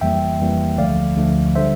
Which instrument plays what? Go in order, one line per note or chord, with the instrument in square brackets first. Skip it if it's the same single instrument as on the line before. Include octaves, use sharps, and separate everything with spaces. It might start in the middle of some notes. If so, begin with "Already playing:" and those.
[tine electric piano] F2 E3 G3 A#3 E5 G5
F2 E3 G3 A#3
D2 D3 F3 A3 D5 F5
D2 D3 F3 A3
D3 G3 C5 E5